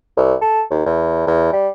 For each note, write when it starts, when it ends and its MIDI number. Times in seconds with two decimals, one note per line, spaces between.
0.17 0.34 36
0.41 0.63 69
0.70 0.85 39
0.86 1.22 40
1.27 1.49 40
1.53 1.69 55